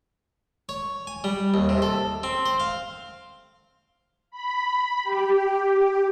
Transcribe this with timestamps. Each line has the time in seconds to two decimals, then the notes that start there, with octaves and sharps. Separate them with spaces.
0.69 C#5
1.07 G#5
1.24 G3
1.54 D#2
1.69 C3
1.82 A4
2.23 C4
2.46 C5
2.60 F5
4.31 B5
5.04 G4